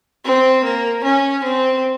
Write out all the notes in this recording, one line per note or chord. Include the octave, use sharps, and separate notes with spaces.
C4
A#3
C#4
C4